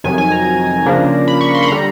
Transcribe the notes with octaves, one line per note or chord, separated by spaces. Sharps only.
F2 C3 D#3 F#3 G#5
G#5
A#5
C#3 F3 A#3 D4
B5
C#6
C6
B5
D3 G3 A#5